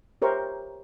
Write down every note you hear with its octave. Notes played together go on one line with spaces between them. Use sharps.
G4 A#4 C5 C#5 E5 C#6